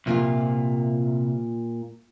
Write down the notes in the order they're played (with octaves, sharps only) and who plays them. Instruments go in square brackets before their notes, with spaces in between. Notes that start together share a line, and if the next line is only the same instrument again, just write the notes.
[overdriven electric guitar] C2 [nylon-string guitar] A#2 A#3 F4